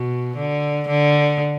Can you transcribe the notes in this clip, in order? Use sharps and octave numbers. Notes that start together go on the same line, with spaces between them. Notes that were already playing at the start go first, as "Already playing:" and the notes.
Already playing: B2
D3
D3